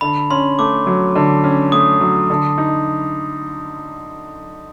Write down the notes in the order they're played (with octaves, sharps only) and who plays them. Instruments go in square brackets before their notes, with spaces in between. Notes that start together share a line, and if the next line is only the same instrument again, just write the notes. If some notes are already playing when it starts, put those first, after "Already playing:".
[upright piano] D3 [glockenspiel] B5
[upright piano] C#4 [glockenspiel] C6
[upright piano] A3 [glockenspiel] D6
[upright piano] F#3
D3
C#4
[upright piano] A3 [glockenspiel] D#6
[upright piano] F#3
D3
D#4